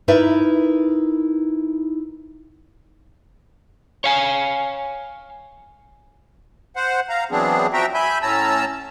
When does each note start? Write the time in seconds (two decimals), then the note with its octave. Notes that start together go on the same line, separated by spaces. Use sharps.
0.08 D#4 E4 A#4 B4 D5 E5
4.04 C#5 F5 G#5
6.76 C5 F#5
7.09 F5 A#5
7.31 E3 F#3 B3 C4 D4 G#4
7.73 F3 F#4 E5 G5 A#5
7.94 E5 G#5 B5 G6
8.22 A2 C#4 A5 A#5 E6